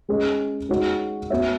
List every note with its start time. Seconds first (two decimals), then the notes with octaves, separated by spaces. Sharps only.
0.09 G#3 C#4 G#4 D#5
0.69 G#3 D#4 F#4 C#5
1.30 B3 F#4 C#5 E5